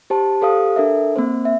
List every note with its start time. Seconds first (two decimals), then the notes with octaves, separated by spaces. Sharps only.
0.10 G4 C5 A5
0.41 G4 A4 C5 F5 D#6
0.76 D4 A4 A#4 E5
1.16 A#3 C4 C5
1.45 E5